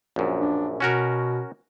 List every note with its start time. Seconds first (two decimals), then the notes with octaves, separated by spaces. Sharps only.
0.16 A#1 F#2
0.41 D4
0.80 B2 C#4 F#4 A#4